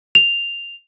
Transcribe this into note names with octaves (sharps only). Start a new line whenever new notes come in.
F7